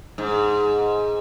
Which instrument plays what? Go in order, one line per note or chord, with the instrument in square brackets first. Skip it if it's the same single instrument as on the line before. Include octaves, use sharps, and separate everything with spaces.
[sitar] G#2